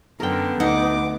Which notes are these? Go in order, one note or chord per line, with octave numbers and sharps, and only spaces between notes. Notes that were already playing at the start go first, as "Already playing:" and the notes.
F#2 D3 B3 A#4 G5
D2 D#4 F#5 D6